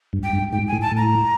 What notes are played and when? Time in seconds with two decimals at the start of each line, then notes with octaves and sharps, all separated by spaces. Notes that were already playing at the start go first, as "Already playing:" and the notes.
0.13 G2
0.23 G5
0.33 G2
0.53 G#2 G5
0.68 A2 G#5
0.82 A5
0.91 A2
0.97 A#5